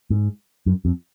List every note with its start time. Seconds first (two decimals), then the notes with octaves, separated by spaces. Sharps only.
0.10 G#2
0.66 F#2
0.85 F2